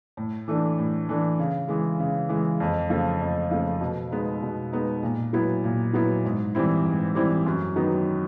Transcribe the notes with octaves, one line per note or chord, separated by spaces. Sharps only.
A2
E3 A3 D4
A2
E3 A3 D4
C#3
E3 G#3
C#3
E3 G#3
F2
C#3 F3 A3
F2
C#3 F3 A3
B2
G#3 B3 D#4
B2
G#3 B3 D#4
A#2
F#3 B3 E4
A#2
F#3 B3 E4
G#2
E3 G3 C4 E4
G#2
E3 G3 C4 E4
F#2
D#3 F#3 B3 D#4